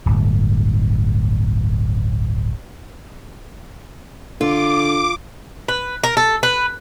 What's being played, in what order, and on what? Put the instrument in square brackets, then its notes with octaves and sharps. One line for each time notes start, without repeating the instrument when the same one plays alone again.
[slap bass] D1 G1
[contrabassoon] D3 [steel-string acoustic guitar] F4 [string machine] D6
[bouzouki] B4
A#4
A4
B4